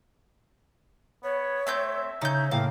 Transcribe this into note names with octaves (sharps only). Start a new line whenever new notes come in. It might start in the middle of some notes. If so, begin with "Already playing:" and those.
B3 C#5
A3 C4 E5 G6 E7
C#3 D#4 C#5 G6
A2 C#3 A#3 F5 G5